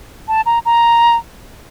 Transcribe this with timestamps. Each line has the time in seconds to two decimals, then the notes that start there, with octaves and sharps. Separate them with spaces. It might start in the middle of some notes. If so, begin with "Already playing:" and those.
0.28 A5
0.46 A#5
0.65 A#5